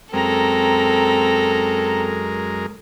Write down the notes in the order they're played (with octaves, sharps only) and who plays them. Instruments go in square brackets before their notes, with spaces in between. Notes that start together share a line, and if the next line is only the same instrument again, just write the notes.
[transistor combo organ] F#2 G#3 A#4 [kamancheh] C4 A#5 [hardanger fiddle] A4